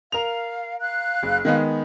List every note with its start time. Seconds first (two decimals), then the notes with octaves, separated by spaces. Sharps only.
0.12 A#4 F5 F7
0.80 F5 F#6
1.23 F#1
1.45 D#3 G#3 B3